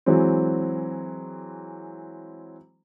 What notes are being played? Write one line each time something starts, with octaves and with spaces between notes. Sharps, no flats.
E3 F#3 G#3 C4